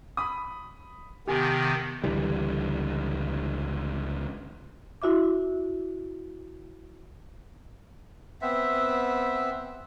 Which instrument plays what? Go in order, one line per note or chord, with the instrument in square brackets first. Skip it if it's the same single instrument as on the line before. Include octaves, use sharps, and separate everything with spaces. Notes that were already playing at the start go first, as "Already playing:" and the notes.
[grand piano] B5 D#6
[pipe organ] C3 D#3 B3 [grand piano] G4 G#5
[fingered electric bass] C#2 D3 E3 G3
[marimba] E4 F#4 E5 D6
[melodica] B3 C4 E5